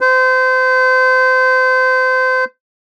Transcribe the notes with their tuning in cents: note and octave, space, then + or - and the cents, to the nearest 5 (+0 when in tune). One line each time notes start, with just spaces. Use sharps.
C5 -30